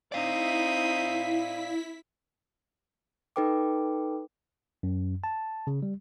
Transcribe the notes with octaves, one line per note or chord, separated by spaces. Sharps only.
C4 D#4 E4 D5 F5 D#6 B6
D#4 A4 B4 G5 D6
F#2
A5
C#3
G3